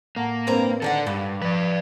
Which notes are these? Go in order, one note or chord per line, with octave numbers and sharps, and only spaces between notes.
A2 A#3 F#5 A5
G2 C4 A#4 B4 A#5
D3 D#3 A4 D5 F#5
G2 G4 F5 B5
F3 B4 D5